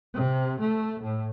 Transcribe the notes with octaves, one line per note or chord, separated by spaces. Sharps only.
C3
A3
A2